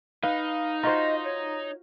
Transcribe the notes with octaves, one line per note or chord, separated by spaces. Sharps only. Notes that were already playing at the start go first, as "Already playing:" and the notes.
D#4 B4 F5
F4 F#4 C5 D#5 A#5
C#5